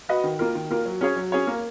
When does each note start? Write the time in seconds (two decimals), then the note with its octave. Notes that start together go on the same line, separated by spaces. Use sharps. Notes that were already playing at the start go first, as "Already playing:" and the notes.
0.09 F#4 B4 D#5
0.24 D#3
0.39 A#3 F4 A#4
0.55 D#3
0.70 A#3 F4 A#4
0.86 F#3
1.01 C#4 G#4 C#5
1.16 F#3
1.32 C#4 G#4 C#5
1.47 A#3